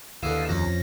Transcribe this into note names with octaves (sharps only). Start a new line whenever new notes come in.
D#2 D3 E3 F5 D#6 E6
F2 F3 C#4 A#6